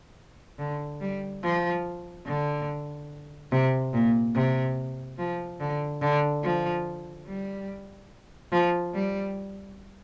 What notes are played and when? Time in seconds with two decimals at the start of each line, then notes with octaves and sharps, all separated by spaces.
0.59 D3
1.01 G3
1.43 F3
2.26 D3
3.52 C3
3.93 A#2
4.35 C3
5.18 F3
5.60 D3
6.02 D3
6.44 F3
7.27 G3
8.52 F3
8.94 G3